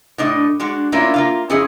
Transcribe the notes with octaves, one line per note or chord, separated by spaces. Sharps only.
A2 D4 D#5
G#3 D4 F#4
A3 A#3 C#4 D4 E4 F4
A#3 F4 F5
F2 C#4 E4 G#4 C#5 D#5